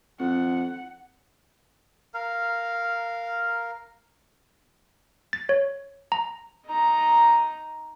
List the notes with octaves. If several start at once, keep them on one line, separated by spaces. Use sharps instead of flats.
F2 C4 F#5
A#4 F5
A6
C#5
A#5
D#4 A#5